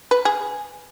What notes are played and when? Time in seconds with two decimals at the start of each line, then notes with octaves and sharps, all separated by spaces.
0.11 B4
0.25 G#4